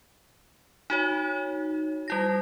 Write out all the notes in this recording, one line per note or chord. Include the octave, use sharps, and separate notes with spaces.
D#4 F#4 C#5
G3 E4 A#6